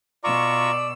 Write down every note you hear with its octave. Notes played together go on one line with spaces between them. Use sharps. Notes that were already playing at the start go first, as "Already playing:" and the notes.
B2 F4 D5 A#5 C#6 E6